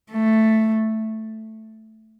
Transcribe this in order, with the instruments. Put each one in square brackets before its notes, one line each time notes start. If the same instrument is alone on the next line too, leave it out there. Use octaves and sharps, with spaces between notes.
[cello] A3